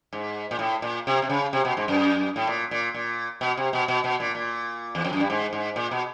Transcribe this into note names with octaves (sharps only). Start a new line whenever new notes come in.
G#2
A#2
A2
A#2
C3
C3
C#3
C3
B2
G#2
F#2
A2
A#2
A#2
A#2
B2
C3
B2
B2
B2
A#2
A#2
E2
F2
F#2
G2
G#2
G#2
A#2
B2